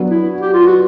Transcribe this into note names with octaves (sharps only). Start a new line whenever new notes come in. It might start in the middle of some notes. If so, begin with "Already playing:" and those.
Already playing: F#3 B3 D4 F#4
E4
G4
F4
F#4